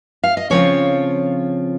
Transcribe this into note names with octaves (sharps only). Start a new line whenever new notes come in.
F5
D#5
C#3 F3 C4 F4 C#5